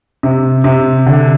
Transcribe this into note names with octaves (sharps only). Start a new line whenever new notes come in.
C3
C3
D3